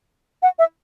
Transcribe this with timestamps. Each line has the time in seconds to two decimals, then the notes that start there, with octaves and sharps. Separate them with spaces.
0.43 F#5
0.59 E5